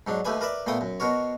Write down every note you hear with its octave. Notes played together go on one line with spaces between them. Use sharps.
G#2 F#3 D4
D#2 A3 G4 B4 G#5
A#4 B4 D5 E5
A#2 A3 B3 G5 D#6
F#2
B2 F#4 A#4 C#5